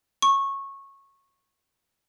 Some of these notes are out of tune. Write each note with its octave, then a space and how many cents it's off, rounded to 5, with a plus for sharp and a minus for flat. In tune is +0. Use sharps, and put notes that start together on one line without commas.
C#6 -15